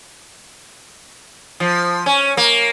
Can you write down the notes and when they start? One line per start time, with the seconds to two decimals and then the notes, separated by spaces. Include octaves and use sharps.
1.60 F3
2.06 C#4
2.37 A#3